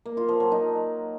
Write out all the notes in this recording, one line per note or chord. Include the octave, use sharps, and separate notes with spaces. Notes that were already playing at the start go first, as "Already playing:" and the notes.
A#3
F4
F3
F#3
D#4